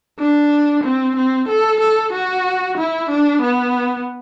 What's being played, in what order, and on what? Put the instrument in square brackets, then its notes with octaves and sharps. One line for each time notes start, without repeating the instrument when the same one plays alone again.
[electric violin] D4
C4
C4
A4
A4
F#4
E4
D4
B3